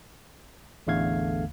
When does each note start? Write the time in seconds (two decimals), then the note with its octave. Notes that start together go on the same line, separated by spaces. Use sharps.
0.87 A1 E2 D3 A3 F5 G#6